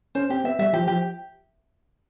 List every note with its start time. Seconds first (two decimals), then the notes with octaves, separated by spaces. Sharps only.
0.15 C#4 C5
0.30 C4 G4
0.44 B3 E5
0.59 G3 E5
0.73 F3 G4
0.88 F3 G4